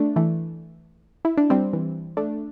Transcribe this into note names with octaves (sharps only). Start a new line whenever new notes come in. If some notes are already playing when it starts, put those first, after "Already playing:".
Already playing: A3 D4
E3 A3
E4
D4
G3 C4
E3
A3 D4